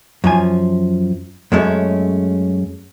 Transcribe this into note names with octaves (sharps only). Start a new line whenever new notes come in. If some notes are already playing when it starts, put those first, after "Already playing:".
F#2 F3 G#5
F#2 G#3 A3 C#4